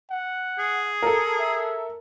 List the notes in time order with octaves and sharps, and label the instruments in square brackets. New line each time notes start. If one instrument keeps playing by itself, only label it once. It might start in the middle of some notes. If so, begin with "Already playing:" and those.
[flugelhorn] F#5
[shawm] G#4
[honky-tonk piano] A4 A#4
[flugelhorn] E5